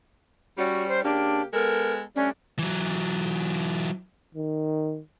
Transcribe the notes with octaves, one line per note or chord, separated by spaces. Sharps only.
G3 C#4 F#4
C5
C#3 A#3 D4 G4
G#3 B3 A4 A#4
G3 A3 C#4 D4
E3 F#3
D#3